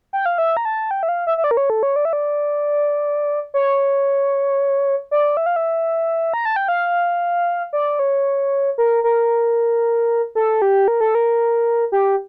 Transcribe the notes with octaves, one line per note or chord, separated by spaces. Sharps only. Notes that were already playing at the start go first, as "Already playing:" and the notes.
G5
F5
E5
A#5
A5
G5
E5
F5
E5
E5
D5
A#4
C#5
A4
C#5
D5
E5
D5
C#5
D5
E5
F5
E5
A#5
A5
G5
F5
D5
C#5
A#4
A#4
A4
G4
A#4
A4
A#4
G4